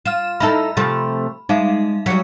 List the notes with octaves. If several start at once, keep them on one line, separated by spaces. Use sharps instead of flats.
F4 F6 E7
D#4 E4 A4 B5
C3 F3 A3
G#3 D#4 E5 F5
F#3 G3 B6 C#7